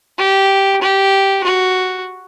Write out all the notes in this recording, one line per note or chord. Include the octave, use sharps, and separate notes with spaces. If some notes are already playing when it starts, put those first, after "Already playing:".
G4
G4
F#4